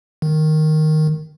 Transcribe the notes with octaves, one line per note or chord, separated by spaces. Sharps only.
D#3